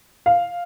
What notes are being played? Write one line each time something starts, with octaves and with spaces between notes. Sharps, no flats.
F5